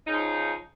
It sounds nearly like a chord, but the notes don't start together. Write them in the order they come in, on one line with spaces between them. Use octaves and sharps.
D#4 C#3 F3